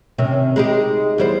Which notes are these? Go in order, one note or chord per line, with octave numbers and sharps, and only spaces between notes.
C3 D#3 C#4
G#3 D#4 G4
E2 G3 C5